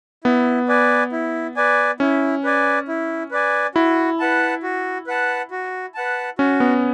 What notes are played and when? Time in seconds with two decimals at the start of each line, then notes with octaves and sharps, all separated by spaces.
0.24 B3 E4
0.68 B4 D5 G#5
1.12 E4
1.56 B4 D5 G#5
2.00 C#4 E4
2.44 B4 D5 G#5
2.88 E4
3.31 B4 D5 G#5
3.75 E4 F#4
4.19 B4 F#5 A5
4.63 F#4
5.07 B4 F#5 A5
5.51 F#4
5.94 B4 F#5 A5
6.38 C#4 F#4
6.60 B3